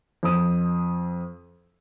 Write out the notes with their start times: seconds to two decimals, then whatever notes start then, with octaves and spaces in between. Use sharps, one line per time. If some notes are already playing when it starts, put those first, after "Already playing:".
0.23 F2 D#6